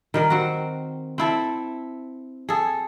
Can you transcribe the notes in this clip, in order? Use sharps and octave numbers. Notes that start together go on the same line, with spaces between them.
D#3 G3 A#4
C4 F#4
C4 E4 A4
G#4 A4